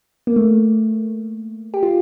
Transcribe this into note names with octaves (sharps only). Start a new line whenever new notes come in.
A#3
A3
G4
F4